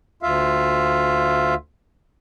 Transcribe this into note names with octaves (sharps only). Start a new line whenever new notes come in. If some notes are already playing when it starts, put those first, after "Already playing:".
D2 F4 E5 F5